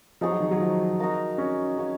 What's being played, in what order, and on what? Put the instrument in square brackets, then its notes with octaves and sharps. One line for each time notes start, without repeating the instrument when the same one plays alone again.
[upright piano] F3 [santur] D#4 G#4 C#5
[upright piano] F#3
D#3
F#3
F3
[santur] D#4 F#4 A#4 F5
[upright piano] C#4
[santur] C#4 G#4 C#5 F5